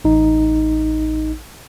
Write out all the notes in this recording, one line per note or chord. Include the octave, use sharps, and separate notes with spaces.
A1 D#4